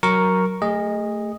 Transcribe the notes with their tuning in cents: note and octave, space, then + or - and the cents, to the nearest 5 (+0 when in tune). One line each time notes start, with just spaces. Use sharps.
F#3 +0 A#4 +0 C#6 +0
A3 +15 G#4 -30 D#5 +0